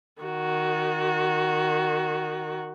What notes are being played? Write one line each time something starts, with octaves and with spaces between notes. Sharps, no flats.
D#3 F#4